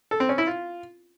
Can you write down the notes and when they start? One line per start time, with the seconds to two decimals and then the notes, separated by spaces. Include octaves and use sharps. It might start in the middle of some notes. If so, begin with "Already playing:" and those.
0.11 A4
0.20 C4
0.29 C#4
0.38 E4
0.47 F4